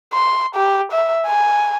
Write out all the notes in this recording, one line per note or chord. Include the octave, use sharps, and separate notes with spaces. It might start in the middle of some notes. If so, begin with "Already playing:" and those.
C6
G4
E5
G#5